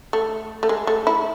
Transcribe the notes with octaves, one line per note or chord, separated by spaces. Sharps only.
A3
A3
G#3
A3
E4